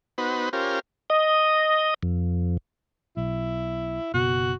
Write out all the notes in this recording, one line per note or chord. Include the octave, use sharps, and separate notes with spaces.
B3 D#4 F#4 B4 C5
C#4 F4 G4 A#4 C5
D#5
F2
B1 E4
F#1 B2 F#4